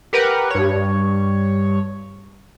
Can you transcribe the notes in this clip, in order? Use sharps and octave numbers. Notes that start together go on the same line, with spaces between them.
G4 A#4 B4 F#5
G2 C#5